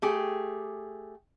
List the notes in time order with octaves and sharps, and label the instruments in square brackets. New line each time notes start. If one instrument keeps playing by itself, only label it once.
[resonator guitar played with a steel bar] A3 G4 G#4